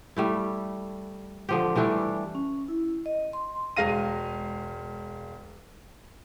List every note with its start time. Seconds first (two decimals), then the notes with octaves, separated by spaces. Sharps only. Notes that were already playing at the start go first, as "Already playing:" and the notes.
0.16 G3 A3 E4
1.49 D3 F3 G4
1.76 E3 G3 A3 D4
2.35 C#4
2.68 E4
3.06 D#5
3.33 C6
3.76 E1 G#3 F5 A#6 D#7